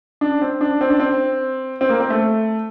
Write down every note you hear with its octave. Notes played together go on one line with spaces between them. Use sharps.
D4
C4
D4
C4
D4
C4
C4
A#3
C4
A3